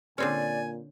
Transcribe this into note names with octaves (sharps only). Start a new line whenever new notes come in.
A#2 D3 C4 C#4 D5 G#5